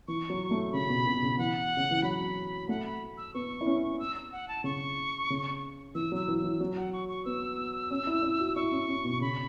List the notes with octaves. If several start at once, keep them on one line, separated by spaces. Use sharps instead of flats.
E3 C#6
F#3
A3
C#3 B5
B2
B2
C#3
E3 F#5
C#3
E3
F#3 B5
A3 F#5
B5
E6
B3 C#6
E4
C#4
E6
E6
F#5
A5
C#3 C#6
C#3
E3 E6
F#3 E6
E3
E6
E3
F#3
F#5
C#6
C#6
B3 E6
C#4
E4
E4
F#4
E4 C#6
C#4
C#4
B2
C#3 B5